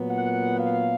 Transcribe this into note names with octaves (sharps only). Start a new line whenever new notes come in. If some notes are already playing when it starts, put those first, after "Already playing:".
Already playing: A#2 F#3 B3
F#5
F5